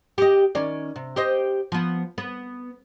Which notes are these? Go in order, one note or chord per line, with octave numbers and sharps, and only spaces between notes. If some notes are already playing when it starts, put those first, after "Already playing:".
G4 D#5
D#3 C#4 D5
C3
G4 C5 D#5
F3 B3
B3